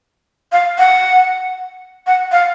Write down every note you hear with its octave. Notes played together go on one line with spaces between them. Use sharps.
F5
F#5
F#5
F5